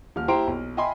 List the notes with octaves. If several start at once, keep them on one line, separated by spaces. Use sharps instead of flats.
D#1 F6
E4 G4 C5 A#5 C6 D7
B1
D#5 E5 G5 G#5 B5 C6